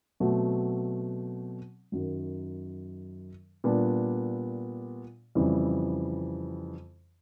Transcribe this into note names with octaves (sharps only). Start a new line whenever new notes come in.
B2 F#3 A3 C4
F#2 D#3 F#3
A#2 G3 B3 D4
F2 C#3 E3 G3